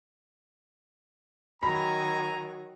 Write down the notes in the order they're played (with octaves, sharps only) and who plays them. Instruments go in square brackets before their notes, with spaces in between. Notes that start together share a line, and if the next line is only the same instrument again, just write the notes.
[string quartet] D#3 F#3 [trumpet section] G#5 A#5 [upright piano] B5